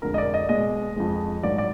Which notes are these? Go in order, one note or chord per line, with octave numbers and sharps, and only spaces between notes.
F2 D3 G#3 A#4
D#5
D5
D#5
B2 G#3 D#5
F2 F3 G#3
G#2 D#3 F#3 D5
D5